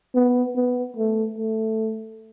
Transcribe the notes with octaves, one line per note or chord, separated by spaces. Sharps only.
B3
B3
A3
A3